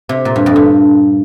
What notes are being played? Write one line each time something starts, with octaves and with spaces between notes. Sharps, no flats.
C3
A#2
G2
F2
G2